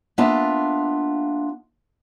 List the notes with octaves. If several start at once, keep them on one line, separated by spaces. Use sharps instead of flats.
A#3 B3 D4 F4 E5 A5